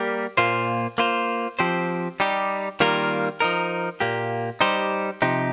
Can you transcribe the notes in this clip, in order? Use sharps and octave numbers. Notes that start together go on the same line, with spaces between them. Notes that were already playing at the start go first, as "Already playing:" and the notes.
Already playing: G3 A#3 G4 A#4
A#2 A#3 F4 C5
A#3 F4 C5
F3 C4 G4 C5
G3 D#4 G4
D#3 G3 A#3 F4 A#4
F3 D#4 A#4
A#2 A#3 G4
G3 D#4 G4 C5
C3 F3 D#4 G4